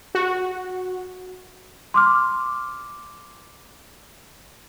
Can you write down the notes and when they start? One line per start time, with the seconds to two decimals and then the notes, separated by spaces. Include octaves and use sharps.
0.15 F#4
1.94 C6 D6 F6